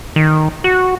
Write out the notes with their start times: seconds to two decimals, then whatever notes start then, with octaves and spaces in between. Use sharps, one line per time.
0.16 D#3
0.64 F#4